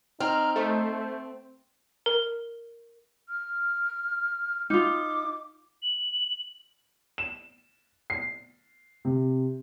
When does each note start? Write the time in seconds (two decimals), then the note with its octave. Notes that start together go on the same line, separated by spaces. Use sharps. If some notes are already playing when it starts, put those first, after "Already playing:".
0.20 C4 D#4 A#5 F6
0.56 A3 C5
2.06 A#4
3.29 F6
4.70 D#4 F4 D6
5.82 F#7
7.18 E7
8.10 C7
9.05 C3